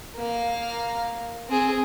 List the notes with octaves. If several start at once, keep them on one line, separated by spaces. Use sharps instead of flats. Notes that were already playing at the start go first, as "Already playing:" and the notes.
A#3 F5
C4 G#4